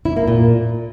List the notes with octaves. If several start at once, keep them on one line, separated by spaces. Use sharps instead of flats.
E4
A#3
A#2